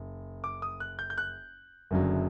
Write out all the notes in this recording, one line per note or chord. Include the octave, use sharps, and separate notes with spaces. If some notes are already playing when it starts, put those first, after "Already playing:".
Already playing: F#1
D6
D#6
F#6
G6
G6
F#6
F#1 F#2 D3 F#3